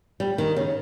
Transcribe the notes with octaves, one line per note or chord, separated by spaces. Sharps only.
G3
D#3
C#3